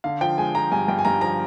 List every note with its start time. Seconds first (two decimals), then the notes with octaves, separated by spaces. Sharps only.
0.04 D3 F5
0.21 F3 G5
0.37 G#3 G#5
0.55 F3 A#5
0.72 G2 G#5
0.88 G2 G5
0.99 G#5
1.05 G2 A#5
1.21 F3 A#5